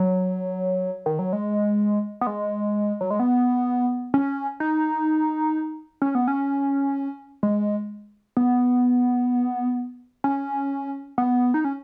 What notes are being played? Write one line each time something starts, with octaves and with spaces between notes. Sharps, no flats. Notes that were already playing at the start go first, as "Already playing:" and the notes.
Already playing: F#3
D#3
F#3
G#3
B3
G#3
F#3
G#3
B3
C#4
D#4
C#4
B3
C#4
G#3
B3
C#4
B3
D#4
C#4